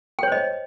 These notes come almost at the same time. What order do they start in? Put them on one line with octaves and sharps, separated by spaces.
G5 C#5 C5 D#5